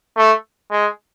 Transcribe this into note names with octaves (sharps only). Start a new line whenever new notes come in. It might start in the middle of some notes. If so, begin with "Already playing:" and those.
A3
G#3